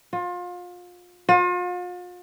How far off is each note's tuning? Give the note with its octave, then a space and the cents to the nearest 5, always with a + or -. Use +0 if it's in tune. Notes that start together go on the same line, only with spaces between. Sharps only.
F4 +30
F4 +40